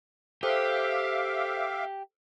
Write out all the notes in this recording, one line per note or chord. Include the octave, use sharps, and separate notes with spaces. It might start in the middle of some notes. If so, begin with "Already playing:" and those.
G4 A4 C5 E5 F5 D6